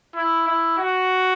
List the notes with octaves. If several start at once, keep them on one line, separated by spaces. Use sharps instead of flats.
E4
E4
F#4